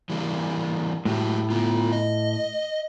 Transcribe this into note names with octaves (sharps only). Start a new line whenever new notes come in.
E3 G3 A#3
A2 G#3 F#4 G4
B3 F4
D#5